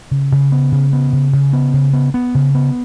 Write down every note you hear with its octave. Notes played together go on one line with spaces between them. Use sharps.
C#3
C#3
B3
C#3
B3
C#3
C#3
B3
C#3
B3
B3
C#3
B3